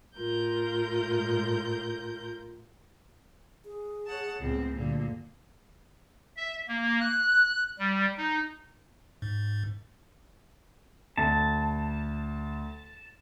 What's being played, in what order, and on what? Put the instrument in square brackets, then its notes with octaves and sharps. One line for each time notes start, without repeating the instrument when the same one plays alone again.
[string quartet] A2 F4 A#4 G6
[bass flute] G#4
[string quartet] C#5 F#5 A5
[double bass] C#2 A2 [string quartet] B3 C4
[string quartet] D2 G2 A#2 [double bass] D3
[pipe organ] E5
A#3
F#6
G3
D#4
[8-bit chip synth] G#2
[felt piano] D2 [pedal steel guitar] A5